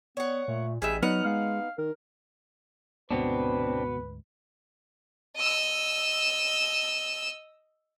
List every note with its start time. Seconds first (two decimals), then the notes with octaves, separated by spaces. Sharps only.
0.17 B3 C#5 F#5
0.48 A#2 A3
0.82 A1 G3 G#3 E5 G#5
1.03 F#3 B3 D#4 F#5 F6
1.25 G#3 F5
1.78 D#3 A#4
3.11 D2 G#2 B2 B3 C4 D4 B4
5.37 D#5 E6